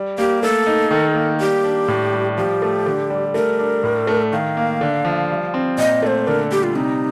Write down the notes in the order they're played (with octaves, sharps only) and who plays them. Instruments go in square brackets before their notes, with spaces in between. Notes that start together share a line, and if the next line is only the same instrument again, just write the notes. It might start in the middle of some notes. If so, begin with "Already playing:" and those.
Already playing: [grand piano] G3
[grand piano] A#3 [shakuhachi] G4
[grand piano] A3 [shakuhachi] A4
[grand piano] D#4
D#3
A#3
[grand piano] G3 [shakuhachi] G4
[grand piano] D4
A2
G3
[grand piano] F3 [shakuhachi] G4
[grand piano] A3
D3
G3
[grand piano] A3 [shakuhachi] A#4
[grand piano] D4
A2
A3
[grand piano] D#3 [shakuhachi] F5
[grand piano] A#3
D3
F3
G3
C4
[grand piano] A#2 [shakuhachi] D#5
[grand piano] A3 [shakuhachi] C5 D#5
[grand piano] D3 [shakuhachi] A#4
[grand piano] G3 [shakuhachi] G4
[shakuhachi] F4
[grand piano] C3 [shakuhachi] D#4